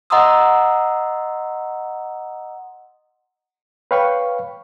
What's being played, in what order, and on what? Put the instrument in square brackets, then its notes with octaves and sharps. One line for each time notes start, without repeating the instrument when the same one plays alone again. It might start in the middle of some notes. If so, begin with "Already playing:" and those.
[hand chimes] D#5 F#5 A#5 C6 D#6 E6
[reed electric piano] B4 C#5 F5 G5 B5 C#6